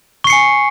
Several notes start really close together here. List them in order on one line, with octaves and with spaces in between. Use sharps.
C#6 C7 C#7 G#5